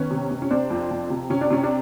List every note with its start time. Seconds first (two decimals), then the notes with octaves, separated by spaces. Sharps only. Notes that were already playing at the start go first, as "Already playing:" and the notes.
Already playing: D#3 B3 C#4
0.11 C3
0.31 C3
0.42 C#4
0.51 C3 C4 D4
0.71 F2
0.91 F2
1.10 C3
1.30 C3 C#4
1.41 D4
1.51 C3 C#4
1.63 D4